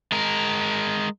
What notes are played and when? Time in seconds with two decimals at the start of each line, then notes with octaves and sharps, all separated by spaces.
0.12 G#3 A#4